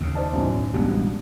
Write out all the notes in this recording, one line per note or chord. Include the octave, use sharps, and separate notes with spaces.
D#2 C#3
C5 D5 A5
B1 F#2 A2
A1 B2 G3 G#3 B3 D4